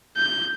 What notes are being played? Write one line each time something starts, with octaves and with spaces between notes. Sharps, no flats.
G6